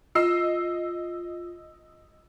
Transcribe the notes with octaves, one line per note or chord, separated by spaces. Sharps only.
F4 D#5 E6 C7